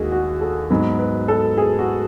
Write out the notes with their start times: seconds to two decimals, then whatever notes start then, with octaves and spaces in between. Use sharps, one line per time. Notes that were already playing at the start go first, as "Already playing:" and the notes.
Already playing: D#2 D#3 G#3 F#4 G#4
0.12 F#4
0.41 A4
0.70 G#2 F#3 B3 B4
0.99 B4
1.28 A4
1.58 G#4
1.79 F#4